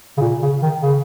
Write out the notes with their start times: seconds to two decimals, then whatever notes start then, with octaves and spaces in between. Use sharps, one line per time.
0.17 C#3
0.21 A#2
0.42 C#3
0.62 D#3
0.82 C#3